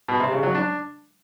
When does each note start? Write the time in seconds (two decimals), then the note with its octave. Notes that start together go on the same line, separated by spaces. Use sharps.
0.08 B2
0.20 C3
0.31 C#3
0.43 F#3
0.55 D4